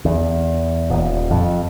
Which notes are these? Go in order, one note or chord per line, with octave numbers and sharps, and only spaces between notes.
E2
D#1
F2